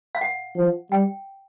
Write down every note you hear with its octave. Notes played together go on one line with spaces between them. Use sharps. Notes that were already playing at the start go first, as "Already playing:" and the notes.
F5
F#5
F3
G3 G5